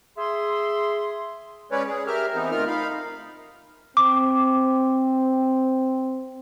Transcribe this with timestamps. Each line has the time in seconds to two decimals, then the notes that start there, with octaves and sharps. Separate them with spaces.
0.18 G#4 E5 C6
1.72 G#3 C#4 B4 C#5 D5
1.87 G#3 G#4
2.07 G4 A#4 E5 F6
2.34 E3 B3 C4 D#4
2.52 D2 D#4 F4 A#4 F6
2.67 D#4 F5 B5
3.97 C4 D6